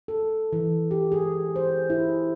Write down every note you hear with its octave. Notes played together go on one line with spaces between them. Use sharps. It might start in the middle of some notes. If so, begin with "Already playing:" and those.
A4
E3
G4
G#4
C5
E4